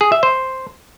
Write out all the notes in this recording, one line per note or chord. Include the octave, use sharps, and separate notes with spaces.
G#4
E5
C5